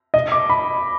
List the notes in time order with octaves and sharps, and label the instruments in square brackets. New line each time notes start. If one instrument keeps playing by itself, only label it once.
[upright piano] D#5
D6
B5